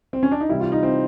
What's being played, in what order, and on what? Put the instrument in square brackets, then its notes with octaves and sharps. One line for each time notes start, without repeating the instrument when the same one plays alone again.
[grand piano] C4
C#4
D4
D#4
C3 E3 G3 E4
F4
D#4
C4